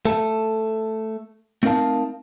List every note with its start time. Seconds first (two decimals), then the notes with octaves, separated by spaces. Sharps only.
0.05 A3 A4
1.63 A3 C4 D#4 A#4 F5 A5